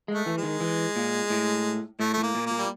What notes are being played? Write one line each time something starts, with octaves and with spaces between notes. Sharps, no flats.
G#3
A3
E3
G#3
D#3
E3
A#2
A2
A2 A3
A2 A3
A#3
A#2
A#3
A#2
G3